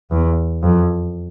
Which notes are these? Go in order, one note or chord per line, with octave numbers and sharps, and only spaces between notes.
E2
F2